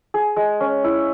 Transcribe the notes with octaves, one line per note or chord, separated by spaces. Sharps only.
G#4
G#3
C#4
E4